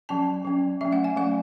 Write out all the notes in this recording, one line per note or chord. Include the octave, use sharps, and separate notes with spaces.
F#3 C#4 A5
F#3 C#4
F#3 A3 C#4 E5
F#5
G#5
F#3 A3 C#4 F#5